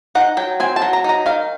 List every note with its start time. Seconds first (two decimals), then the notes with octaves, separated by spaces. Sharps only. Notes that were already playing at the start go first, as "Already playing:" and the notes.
0.15 D#4 F#5
0.37 F#3 G5
0.60 C4 G#5
0.76 A5
0.82 F#3
0.93 A#5
1.04 D#4 A#5
1.26 D#3 F5